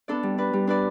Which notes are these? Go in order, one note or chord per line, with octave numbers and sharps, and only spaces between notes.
B3 D4 A4 D5
G3
D4 B4 D5
G3
D4 B4 D5